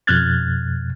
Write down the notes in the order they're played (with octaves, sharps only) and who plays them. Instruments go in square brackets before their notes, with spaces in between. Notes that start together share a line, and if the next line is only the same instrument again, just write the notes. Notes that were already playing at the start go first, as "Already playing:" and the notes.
[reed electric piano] F2 B2 F6 F#6 G#6 A6